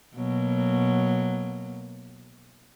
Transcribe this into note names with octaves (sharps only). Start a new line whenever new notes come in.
B2 F#3 A#3